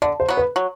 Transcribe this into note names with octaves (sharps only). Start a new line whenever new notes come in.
D3 D5
C5
F#3 B3
B4
F#3